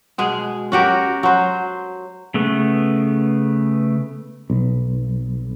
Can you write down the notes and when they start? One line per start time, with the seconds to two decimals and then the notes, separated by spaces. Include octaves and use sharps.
0.18 B2 G#3 G#4
0.72 C#4 F#4 G4 A#4
1.23 F#3 C5
2.34 C#3 A3 B3
4.50 B1